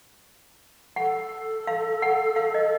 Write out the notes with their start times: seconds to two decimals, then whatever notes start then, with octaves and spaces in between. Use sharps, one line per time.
0.96 A4 F#5
1.67 F5
2.02 F#5
2.36 F5
2.54 D#5